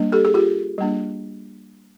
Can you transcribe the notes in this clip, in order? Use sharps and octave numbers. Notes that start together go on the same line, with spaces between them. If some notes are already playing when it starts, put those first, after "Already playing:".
Already playing: G3 A#3 D4
G4 A4
G#4
F4 G4
G3 A#3 D4